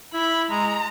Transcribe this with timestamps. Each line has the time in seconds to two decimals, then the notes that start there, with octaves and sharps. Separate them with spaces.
0.14 E4 B5
0.50 G#3 A#5